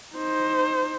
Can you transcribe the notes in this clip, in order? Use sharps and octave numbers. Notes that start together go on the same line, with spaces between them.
D#4 C5